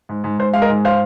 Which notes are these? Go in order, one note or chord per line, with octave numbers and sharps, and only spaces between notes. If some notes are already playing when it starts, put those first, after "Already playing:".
G#2
G#2
G#2 C5
G#3 F5
A#4 D#5
G#2
C5 F5